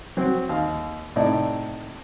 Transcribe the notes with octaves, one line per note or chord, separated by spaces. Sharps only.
F#3 C4
D#2 F5
A2 C3 D#4 D5